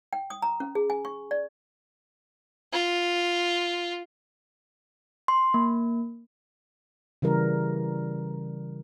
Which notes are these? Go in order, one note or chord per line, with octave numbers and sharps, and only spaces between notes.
G5
D#6
A#5
C#4
G#4
G#5
C#6
D5
F4
C6
A#3
C#3 E3 G3 A#4